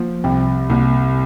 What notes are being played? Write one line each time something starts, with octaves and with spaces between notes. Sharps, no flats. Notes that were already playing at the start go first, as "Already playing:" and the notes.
Already playing: F3 A#3
C2 C4
C2 A#3